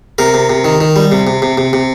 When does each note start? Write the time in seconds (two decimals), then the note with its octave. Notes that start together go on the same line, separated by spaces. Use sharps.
0.18 C3 A#4
0.34 C3
0.49 C3
0.65 D#3
0.81 D#3
0.96 G3
1.12 C3
1.27 C3
1.42 C3
1.58 C3
1.73 C3